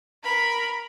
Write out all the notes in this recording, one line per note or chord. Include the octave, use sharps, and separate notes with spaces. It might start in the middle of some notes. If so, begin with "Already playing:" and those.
A#4 B5